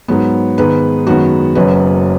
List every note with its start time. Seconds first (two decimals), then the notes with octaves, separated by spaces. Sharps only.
0.08 G#2 F#3 B3
0.57 G#2 D#3 G#3 B3 B4
1.07 F#2 D#3 G#3 B3 F#4
1.55 F#1 F#2 F#3 C#4 B4